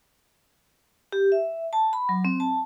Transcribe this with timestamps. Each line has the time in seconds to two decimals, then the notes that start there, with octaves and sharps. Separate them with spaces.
1.12 G4
1.32 E5
1.73 A5
1.93 B5
2.09 F#3
2.25 C4
2.40 A5